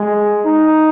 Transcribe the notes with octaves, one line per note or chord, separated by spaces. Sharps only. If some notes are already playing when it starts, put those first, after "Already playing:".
Already playing: G#3
D#4